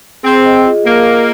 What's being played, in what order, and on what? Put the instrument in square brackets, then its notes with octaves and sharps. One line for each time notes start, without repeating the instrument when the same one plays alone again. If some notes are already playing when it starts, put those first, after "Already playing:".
[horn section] C4 [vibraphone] G#4
[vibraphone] D#5
F4
[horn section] A#3 [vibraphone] F4
[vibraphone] G#4